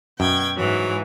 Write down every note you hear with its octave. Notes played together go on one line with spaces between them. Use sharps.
F#2 B2 G5 G#6
G#2 E3 F#3